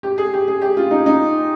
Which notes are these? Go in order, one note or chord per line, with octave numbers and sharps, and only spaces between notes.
G4
G#4
G4
G#4
G4
F4
D#4
D#4